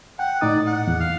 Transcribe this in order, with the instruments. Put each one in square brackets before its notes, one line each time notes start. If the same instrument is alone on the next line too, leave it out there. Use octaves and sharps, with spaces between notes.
[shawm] F#5 [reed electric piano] G5
[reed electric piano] A2 D#4 D#6 [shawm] D5
[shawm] F#5
[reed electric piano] E2
[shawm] F5